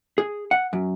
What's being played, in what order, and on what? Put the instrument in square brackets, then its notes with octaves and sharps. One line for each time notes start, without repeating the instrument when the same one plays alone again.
[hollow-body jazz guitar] G#4
F#5
F#2